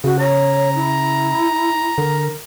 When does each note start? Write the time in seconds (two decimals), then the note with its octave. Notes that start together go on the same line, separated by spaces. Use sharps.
0.04 C#3 F#4
0.19 C#5 A#5
0.75 E4
1.98 D3 A#4